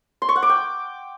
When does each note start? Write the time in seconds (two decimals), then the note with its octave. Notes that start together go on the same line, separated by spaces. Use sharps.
0.22 C6
0.29 C#6
0.36 F#5
0.42 D6
0.49 G5